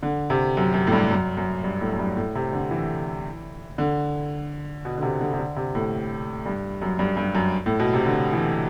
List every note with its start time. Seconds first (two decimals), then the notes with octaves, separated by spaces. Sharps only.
0.03 D3
0.30 C3
0.57 F#2
0.74 F#2
0.87 A2
0.92 G2
1.10 F#2
1.37 F#2
1.64 G2
1.81 A2
1.92 F#2
1.99 G2
2.17 A2
2.35 C3
2.53 D3
2.71 E3
3.78 D3
4.85 B2
4.98 D3
5.02 C3
5.21 D3
5.33 C3
5.39 D3
5.56 C3
5.75 A2
6.46 G2
6.82 F#2
6.99 G2
7.17 G2
7.35 F#2
7.66 A2
7.79 B2
7.93 C3
8.06 D3
8.33 E3